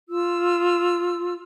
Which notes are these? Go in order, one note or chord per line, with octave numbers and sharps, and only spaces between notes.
F4 E6